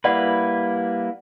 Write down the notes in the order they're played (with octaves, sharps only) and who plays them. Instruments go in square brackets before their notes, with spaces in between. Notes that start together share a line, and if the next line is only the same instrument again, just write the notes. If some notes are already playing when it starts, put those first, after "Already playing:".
[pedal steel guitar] G3 A#3 E4 B4 [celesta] D5 F#5